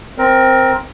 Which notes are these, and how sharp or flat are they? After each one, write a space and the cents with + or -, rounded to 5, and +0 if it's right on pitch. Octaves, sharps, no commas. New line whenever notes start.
C4 +0 A#4 +15